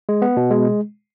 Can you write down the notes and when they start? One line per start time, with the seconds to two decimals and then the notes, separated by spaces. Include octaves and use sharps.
0.09 G#3
0.22 B3
0.37 B2
0.50 G#3